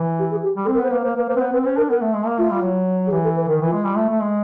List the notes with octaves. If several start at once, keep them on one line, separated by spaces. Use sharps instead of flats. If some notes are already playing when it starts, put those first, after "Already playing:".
Already playing: E3
G4
G#4
G4
G3
C4 A4
A#4
B3 C5
A#3 B4
A#3 C5
A#3 B4
A#3 C5
C4 B4
B3 C5
C4 B4
C#4 C5
D4 A#4
B3 A#4
A3
G#3
A#3
A3 F4
G3
F#3
G#4
E3 G4
A4
B4
D#3 A#4
E3
F4
G#3
G3
A3
A3
G#3